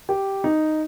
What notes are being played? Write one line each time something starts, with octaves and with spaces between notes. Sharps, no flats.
G4
D#4